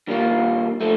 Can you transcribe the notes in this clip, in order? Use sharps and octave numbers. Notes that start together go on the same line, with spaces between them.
G2 D#3 G3 A#3 F4
F3 A3